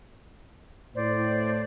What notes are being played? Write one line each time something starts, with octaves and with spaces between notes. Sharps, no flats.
A2 C5 D5